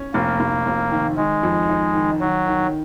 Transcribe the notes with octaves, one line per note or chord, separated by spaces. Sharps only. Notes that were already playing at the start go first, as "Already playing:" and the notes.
Already playing: C#4
F1 A#3
F1
F1
D#3
D#3 G#3
F2
D#4
D#3
D#3 F#3
D#3